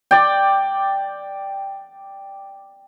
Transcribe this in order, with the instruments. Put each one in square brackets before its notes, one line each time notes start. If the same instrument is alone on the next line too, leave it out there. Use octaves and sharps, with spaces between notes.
[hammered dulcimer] D5 G5